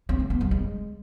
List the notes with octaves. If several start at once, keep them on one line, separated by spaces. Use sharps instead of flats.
C4
A3
B3
G3
G#3